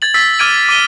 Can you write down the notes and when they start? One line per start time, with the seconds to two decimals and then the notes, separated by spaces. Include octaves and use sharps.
0.02 G#6 A6 F#7
0.14 E6 A6 B6
0.39 D6 F6 G#6 D7 D#7 F#7
0.69 D6 D#7 G7